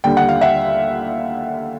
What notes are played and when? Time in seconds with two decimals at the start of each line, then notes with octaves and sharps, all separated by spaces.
0.04 D#2 D3 G3 G5
0.17 F#5
0.29 F5
0.41 E5 F#5